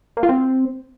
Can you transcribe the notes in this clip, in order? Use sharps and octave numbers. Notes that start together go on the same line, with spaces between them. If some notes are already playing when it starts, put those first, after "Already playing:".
A#3
F4
C4